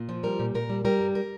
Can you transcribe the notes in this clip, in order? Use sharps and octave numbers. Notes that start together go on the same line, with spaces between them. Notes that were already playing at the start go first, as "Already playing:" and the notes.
Already playing: A#2
F3
G3 A#4
A#2
A#2 A#4
G3
G3 A#4
G2
A#4